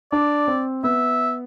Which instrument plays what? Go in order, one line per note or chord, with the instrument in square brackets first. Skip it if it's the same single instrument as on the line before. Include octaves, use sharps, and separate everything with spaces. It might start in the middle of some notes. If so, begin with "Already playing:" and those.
[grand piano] D4 [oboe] D5
[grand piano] C4
[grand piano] B3 [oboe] E5